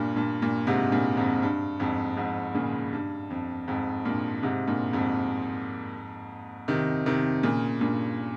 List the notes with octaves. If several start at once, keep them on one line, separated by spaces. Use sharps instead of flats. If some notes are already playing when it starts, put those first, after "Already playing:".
Already playing: G2 A#2
G2 A#2
G2 A#2
G#2 C3
G2 A#2
F2 G#2
G2
F2 G#2
F2 G#2
A#2 C#3
G2
F2
F2 G#2
G2 A#2
G#2 C3
G2 A#2
F2 G#2
C3 D#3
C3 D#3
A#2 C#3
G2 A#2